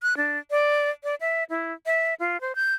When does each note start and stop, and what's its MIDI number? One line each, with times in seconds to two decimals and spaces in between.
0.02 0.16 90
0.17 0.39 62
0.51 0.90 74
1.04 1.15 74
1.20 1.44 76
1.50 1.73 64
1.86 2.14 76
2.20 2.40 65
2.41 2.55 72
2.56 2.75 91